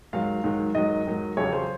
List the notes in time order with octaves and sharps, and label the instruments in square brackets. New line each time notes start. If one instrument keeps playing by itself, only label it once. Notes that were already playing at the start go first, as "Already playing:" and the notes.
[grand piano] G#2 D#3 F#3 F5
G#2 D#3 F#3
G#2 D#3 F#3 D#5
G#2 D#3 F#3
F2 C#3 F#3 C#5
C5